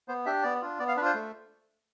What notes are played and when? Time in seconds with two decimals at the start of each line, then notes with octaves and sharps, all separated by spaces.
0.08 B3 C5
0.26 D4 G4 E5
0.43 B3 D5
0.62 D4 F4
0.79 B3 D5
0.88 F5
0.96 D4 B4
1.01 F4 C5
1.14 A3